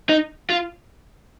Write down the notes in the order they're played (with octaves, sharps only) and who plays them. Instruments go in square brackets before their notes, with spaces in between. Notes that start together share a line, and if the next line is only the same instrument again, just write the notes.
[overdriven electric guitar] D#4
F4